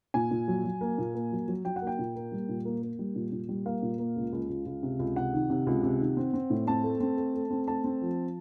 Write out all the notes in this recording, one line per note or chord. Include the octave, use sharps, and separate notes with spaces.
A#2 G#5
A#2
F#3
F#3
A#3
A#2
A#3
F#3
F#3
F#3 G5
F#5
A#3
G5
A#2
A#3
G3
A#2
A#3
A#3
G3
A#2
A#2
G3
A#3 F5
A#2
A#3
C#2
C#2
C#2
C#2
C3
C#2
C3 F#5
D#3
C3
C#2
C3
D#3
C4
C4
A2
C4 A5
A3
C4
A3
A3
C4
A3 A5
C4
F3